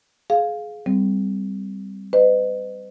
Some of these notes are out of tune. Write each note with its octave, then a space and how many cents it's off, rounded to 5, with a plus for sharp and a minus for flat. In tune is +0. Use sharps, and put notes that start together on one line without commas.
G#4 +25 F5 +5
G3 +0 C4 -15
B4 +45 D#5 -30